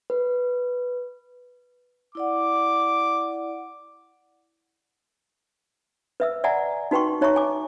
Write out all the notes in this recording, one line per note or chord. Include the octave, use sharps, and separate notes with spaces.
B4
E4 D5 F#5 D6
B4 E5 E6
D5 E5 F#5 G#5 A#5
D#4 F#4 B4 G5 C6 C#6
D#4 C#5 E5 A#5 C#6
G#5 D6